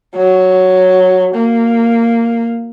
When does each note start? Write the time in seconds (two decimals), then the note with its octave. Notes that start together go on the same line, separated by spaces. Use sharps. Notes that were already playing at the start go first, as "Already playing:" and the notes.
0.15 F#3
1.35 A#3